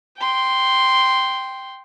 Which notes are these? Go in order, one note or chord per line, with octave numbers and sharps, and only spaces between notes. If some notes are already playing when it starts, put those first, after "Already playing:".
G5 C6